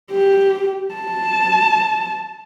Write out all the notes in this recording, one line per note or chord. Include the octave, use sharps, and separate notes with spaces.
G4
A5